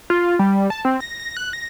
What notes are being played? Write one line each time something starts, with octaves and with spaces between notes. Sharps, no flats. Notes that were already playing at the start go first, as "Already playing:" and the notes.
F4
G3
A5
C4
A#6
A#6
F#6
A#6